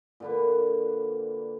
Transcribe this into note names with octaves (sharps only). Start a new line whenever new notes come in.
A#2 D3 B4